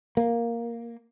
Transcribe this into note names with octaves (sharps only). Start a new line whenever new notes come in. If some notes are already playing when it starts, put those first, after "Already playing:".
A#3